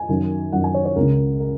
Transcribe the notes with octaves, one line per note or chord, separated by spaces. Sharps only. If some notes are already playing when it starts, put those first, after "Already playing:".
Already playing: G#5
F#2 D#3
F#2 D#3 F#5
G#5
C#5
C#5
C#2 C#3 A#4
A#4